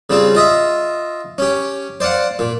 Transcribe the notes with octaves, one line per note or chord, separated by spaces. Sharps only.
C#3 G3 C4 F4
F4 D#5 E5
C#4 G4
C5 D5 F5 F#5
A#2